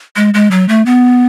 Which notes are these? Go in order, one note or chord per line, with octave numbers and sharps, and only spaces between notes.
G#3
G#3
F#3
A3
B3